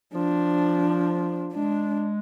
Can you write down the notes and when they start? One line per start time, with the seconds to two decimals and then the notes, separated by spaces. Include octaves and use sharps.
0.14 F3 D4
1.53 G#3 D4